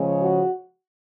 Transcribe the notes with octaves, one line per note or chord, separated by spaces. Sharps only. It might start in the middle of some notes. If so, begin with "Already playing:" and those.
Already playing: C#3 F3 G#3 C#4
F#4